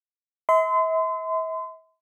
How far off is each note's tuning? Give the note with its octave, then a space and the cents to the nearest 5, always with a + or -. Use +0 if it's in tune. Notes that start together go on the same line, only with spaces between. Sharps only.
E5 -40 C6 -35